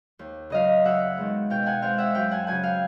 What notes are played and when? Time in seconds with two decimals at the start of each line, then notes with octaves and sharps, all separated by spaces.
0.19 D#2
0.50 C#3 F#3 D#5 F5
0.84 F#2 E5 F#5
1.17 D#3 G#3 B3
1.50 B2 F5 G5
1.66 F#5 G#5
1.82 G#3 C4 F5 G5
1.98 E5 F#5
2.15 F#2 F5 G5
2.31 F#5 G#5
2.47 C#3 F#3 F#5 G#5
2.63 F5 G5